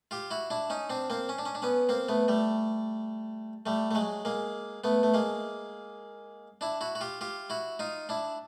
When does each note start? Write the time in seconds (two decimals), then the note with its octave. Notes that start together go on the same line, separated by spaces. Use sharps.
0.11 F4 G4
0.31 E4 F#4
0.50 D4 E4
0.70 C#4 D#4
0.90 C4 D4
1.10 A#3 C4
1.29 C#4
1.38 D4
1.46 C#4
1.55 D4
1.62 B3 C#4
1.89 A#3 C4
2.09 A3 B3
2.28 G3 A3
3.66 G3 A3
3.91 A3
3.95 F#3 G#3
4.25 G#3 A#3
4.84 A3 B3
5.03 A3
5.14 G#3 A#3
6.61 D4 E4
6.81 E4 F#4
6.95 F#4
7.01 F4 G4
7.21 F4 G4
7.50 E4 F#4
7.79 D#4 F4
8.09 D4 E4